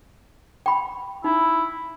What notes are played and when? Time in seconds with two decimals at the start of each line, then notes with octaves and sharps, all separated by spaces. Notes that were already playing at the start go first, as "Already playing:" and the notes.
0.66 G5 B5
1.24 D#4 E4